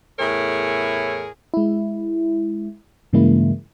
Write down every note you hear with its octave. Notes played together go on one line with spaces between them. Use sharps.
E2 A2 E4 G#4 A#4 C#5
G#3 E4
G2 C#3 E3 G#3 A#3 E4